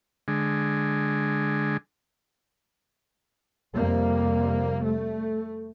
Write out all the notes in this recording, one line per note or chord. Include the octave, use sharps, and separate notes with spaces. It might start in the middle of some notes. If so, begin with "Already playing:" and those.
D3 G#3
F2 C3 G3 A#3
A3